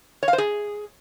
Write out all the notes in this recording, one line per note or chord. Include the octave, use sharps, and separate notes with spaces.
C#5
F5
C5
G#4